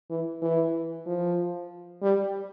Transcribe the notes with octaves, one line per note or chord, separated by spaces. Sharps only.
E3
E3
F3
G3